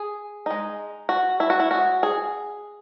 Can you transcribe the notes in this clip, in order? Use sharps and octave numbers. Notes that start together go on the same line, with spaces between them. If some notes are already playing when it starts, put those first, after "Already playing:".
Already playing: G#4
G#3 D#4
F#4
E4
F#4
E4
G#3 C#4 F#4
G#4